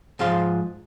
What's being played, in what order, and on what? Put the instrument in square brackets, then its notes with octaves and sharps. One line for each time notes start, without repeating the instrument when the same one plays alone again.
[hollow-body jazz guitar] G#2 F3 F5 C6